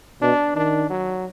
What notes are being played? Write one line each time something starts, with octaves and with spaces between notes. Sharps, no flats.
B2 D4
D#3 D4
F#3